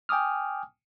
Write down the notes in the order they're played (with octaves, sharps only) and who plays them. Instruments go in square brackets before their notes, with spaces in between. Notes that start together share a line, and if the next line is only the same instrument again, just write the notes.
[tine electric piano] G5 G#5 D6 D#6 F6